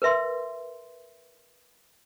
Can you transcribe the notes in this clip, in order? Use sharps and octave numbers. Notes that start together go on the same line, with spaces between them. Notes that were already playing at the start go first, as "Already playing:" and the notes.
A#4 B4 E5 C6